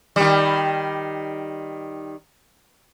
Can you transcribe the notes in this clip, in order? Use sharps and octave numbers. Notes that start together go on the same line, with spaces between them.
D#3 G3